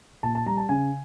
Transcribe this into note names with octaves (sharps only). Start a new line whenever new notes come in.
A#2 A5
A5
G3 A#5
A5
C#3 G#5